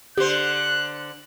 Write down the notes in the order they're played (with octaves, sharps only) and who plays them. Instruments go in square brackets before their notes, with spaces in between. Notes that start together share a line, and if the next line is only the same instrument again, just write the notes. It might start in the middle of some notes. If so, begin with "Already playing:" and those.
[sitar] D3 C5 [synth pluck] G4 [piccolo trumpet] F#6